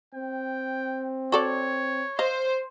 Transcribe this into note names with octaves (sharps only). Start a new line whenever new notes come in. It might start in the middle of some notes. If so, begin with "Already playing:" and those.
C4 G5
F#4 A4 C#5 D5
C5 D#5 F5